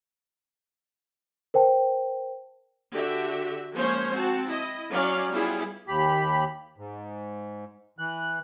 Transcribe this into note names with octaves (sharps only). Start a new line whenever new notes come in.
A#4 C5 G5 A5
D3 F#4 G4 E5
F3 G#3 A#3 C#4 C5 C#5
C4 F#4 A5
E4 D#5
F#3 C#4 D5 F5
G3 B3 E4 F4 G#4
D#2 G4 B5
G#2
E3 F#6